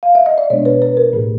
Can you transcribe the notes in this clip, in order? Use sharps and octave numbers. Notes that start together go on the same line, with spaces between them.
F5
E5
D#5
D5
B2 G#3 B3 D4 C#5
B4
B4
A#4
A2 E3 A3 G#4